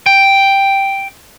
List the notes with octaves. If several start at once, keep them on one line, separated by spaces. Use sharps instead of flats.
G5